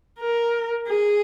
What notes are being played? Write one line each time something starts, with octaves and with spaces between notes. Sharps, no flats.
A#4
G#4